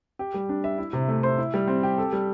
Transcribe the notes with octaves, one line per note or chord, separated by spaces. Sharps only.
G4
G3
D4
E5
E4
C3
A3
C5
E4
G3
C4
G4
A4
G3